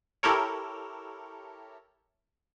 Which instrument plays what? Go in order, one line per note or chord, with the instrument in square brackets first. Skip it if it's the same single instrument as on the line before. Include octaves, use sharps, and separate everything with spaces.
[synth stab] E4 G4 A4 A#4 C#5